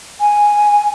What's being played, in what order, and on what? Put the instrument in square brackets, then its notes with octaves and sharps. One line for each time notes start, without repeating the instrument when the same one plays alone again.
[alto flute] G#5